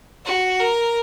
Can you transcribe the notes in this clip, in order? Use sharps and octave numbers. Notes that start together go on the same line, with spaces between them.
F#4
A#4